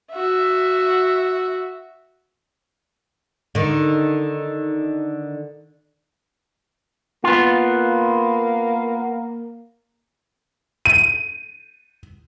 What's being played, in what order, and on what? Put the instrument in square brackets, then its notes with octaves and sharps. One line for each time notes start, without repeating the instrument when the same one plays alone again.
[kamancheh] F#4 E5
[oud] D3 D#3
[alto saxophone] A#3 [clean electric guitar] B3 F4
[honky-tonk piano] D#7